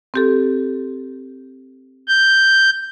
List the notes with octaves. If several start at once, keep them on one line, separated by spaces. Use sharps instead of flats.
C4 G4 A4
G6